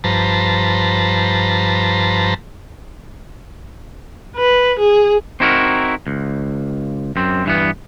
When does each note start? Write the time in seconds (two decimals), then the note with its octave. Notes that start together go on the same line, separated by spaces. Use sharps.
0.04 G2 F3 B4 C5 A5 A#5
4.37 B4
4.80 G#4
5.40 C4 D#4 E4 F#4 A#4
6.07 C#2
7.16 F#2 C4
7.45 G2 E3 B3